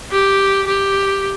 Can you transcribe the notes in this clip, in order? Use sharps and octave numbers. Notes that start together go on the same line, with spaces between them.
G4
G4